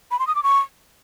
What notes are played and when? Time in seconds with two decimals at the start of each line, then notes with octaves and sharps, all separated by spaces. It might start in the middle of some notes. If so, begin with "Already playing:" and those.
0.11 B5
0.19 C6
0.27 D#6
0.35 D6
0.43 C#6